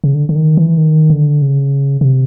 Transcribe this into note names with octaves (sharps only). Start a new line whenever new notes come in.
C#3
D3
D3
D#3
E3
D#3
D3
C#3
C#3
C3